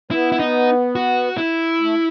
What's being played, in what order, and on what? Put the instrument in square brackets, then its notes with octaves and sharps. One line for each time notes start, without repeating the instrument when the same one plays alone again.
[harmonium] B3 [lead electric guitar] E4
[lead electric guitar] E4
D#4
F#4
E4
[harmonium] A3